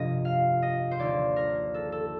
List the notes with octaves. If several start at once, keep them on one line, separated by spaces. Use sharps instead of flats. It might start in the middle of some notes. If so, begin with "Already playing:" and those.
Already playing: G1 F2 C3 F3 D#5
F5
D#5
C5
D#2 D3 F3 D5
A#4
A4
A4